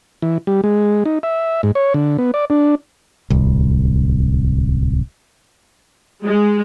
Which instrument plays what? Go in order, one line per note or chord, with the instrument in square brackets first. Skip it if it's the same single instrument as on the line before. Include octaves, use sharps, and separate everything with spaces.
[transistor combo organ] E3
G3
G#3
D#4
E5
G#2
C#5
D3
B3
D5
D4
[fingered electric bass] D1 C2
[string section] G#3